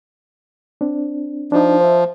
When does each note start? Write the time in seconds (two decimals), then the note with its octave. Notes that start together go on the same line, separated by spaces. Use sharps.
0.81 C4 D4
1.52 F3 D4 D#4
1.81 C5 E5